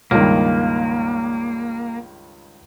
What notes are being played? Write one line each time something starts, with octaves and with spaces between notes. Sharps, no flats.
C#2 G2 D#3 A#3